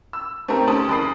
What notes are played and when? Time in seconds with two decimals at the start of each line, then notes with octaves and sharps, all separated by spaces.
0.13 E6
0.48 A3 C4 D#4 G4 A#4
0.67 D2 C#4 A4 A5 D#6 F#7
0.89 F#1 E3 B5 D#6 C7